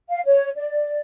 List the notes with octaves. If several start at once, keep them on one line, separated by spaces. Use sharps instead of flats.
F5
C#5
D5